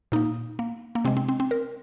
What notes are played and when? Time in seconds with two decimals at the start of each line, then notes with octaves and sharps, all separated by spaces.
0.12 A#2 A#3 D#4
0.59 A#3
0.95 A#3
1.05 C3 G#3 C4
1.17 C4
1.29 C4
1.40 C4
1.51 A#4